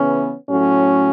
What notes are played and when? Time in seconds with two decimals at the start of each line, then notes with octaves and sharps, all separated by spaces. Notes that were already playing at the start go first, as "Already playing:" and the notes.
Already playing: C#3 E3 B3 C#4
0.49 A2 F#3 A3 C#4